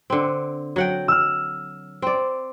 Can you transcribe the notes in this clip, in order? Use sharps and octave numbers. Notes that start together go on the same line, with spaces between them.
D3 C4
F#3 F#5 G5
E6 F6
C4 D5